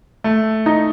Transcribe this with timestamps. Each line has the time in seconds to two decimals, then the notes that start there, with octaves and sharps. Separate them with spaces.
0.24 A3
0.66 D#4